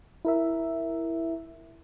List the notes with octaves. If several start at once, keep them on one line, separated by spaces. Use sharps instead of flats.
E4 A#4 E5